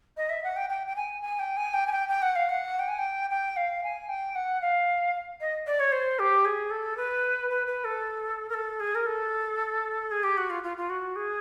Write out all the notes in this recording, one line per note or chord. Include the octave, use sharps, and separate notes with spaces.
D#5
E5
F#5
G5
G5
G5
G#5
G#5
G5
G#5
G5
G#5
G5
G5
F#5
F5
F#5
G5
G#5
G5
G5
F5
G#5
G5
F#5
F5
D#5
D5
C#5
C5
G4
G#4
A4
B4
B4
B4
A4
A#4
A4
G#4
A#4
A4
G#4
G4
F#4
F4
F4
F4
F#4
G#4